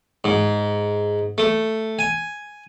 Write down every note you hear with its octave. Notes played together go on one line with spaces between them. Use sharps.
G#2
A3
G#5